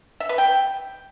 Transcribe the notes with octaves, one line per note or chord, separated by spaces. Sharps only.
E5
B4
G5